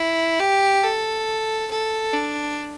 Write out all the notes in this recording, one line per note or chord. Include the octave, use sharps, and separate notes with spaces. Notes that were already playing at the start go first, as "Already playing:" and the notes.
Already playing: E4
G4
A4
A4
D4